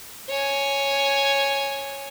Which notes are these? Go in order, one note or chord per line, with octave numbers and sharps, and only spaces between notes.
C#5 G#5